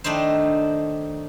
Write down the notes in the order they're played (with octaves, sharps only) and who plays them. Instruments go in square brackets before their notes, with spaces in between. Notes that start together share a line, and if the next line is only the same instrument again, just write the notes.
[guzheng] D#3 A3 D4 D#4 C5